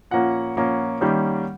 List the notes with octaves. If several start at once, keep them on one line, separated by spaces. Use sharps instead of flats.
A#2 F3 A#3 C#4 F#5
A#2 F3 A#3 C#4
D#3 G3 A#3 C#4